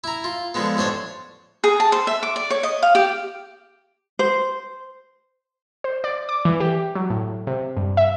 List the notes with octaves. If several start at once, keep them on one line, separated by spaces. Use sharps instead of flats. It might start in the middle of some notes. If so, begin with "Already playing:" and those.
E4 A#5
F4
D3 F3 G#3 B3
A1 D4 C5 C#5
G#4
A5
C5
E5
D6
D5
C#5
D#5
F5
G4
C5
C5
D5
D6
E3
G4
F#3
A2
C3
G2
E5